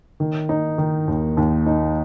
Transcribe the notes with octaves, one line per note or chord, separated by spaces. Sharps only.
D#3
D#4
D#3
D#2
D#2
D#4